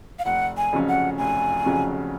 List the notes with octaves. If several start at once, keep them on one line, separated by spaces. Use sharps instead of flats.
F5
F1 F#5
G#5
F2 C#3 F#3 C#4
F#5
F1 G#5
F2 C#3 F#3 C#4